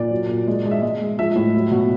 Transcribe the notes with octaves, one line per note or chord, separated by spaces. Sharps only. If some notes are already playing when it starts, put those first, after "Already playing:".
Already playing: A#2 D5
F#3
A#2
G#3
G#3
E5
G#3 D#5
G#3
F3 E5
A2
F#3
B2